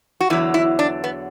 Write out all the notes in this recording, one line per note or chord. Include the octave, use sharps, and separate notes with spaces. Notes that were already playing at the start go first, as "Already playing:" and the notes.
F#4
E2 D3 F#3 E4
E4
D4
B3